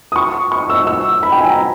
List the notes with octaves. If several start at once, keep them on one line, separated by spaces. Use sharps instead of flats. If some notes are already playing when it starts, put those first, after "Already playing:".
D#6
C#6
C#6
E6
E6
B5
G5
G#5
A#5